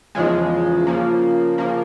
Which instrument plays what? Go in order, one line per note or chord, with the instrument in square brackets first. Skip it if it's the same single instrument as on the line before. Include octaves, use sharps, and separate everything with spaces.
[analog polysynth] E2 C#3 F3 G#3
C#3 F3 A#3
C#3 F3 A#3